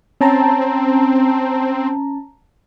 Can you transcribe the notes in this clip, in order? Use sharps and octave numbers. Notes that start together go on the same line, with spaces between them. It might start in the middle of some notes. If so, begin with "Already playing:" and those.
C4 C#4 A5 A#5